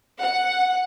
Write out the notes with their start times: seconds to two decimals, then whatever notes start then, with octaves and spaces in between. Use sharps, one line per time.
0.23 F#5